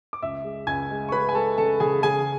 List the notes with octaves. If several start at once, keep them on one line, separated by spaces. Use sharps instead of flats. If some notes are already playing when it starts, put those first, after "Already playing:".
D6
C#2 E5 E6
G#3
C#2 G#5 G#6
G#3
C#6
G#3 B4 B5
G#5
G#3 A4 A5
C#3 A4 A5
C#3 G#4 G#5
C#3 G#4 G#5